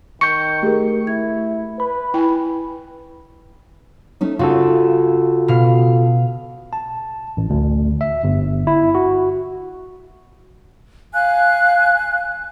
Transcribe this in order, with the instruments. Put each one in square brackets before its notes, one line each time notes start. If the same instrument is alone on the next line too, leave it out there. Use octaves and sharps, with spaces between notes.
[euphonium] D#3 [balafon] C#6 [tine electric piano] G6 C#7
[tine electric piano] A3 [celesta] G4 G#4 A#4
[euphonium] E4 [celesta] G#6
[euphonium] B4 [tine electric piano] B5
[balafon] E4 [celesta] G5 G#5
[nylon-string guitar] A3 C#4 D#4
[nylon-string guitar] C#3 [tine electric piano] F4 F#4 A4
[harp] B2 F5
[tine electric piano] A5
A1
D2
E5
G1
E4
F#4
[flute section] F5 G#5 F#6